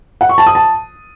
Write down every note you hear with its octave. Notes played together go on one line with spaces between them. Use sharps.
F#5
C#6
A5
D#6
A5